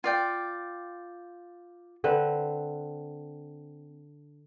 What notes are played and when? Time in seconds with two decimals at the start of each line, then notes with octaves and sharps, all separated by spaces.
0.04 F4 D5 G5
2.04 D3 C4 B4